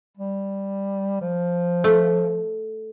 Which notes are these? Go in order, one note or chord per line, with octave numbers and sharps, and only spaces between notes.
G3
F3
A3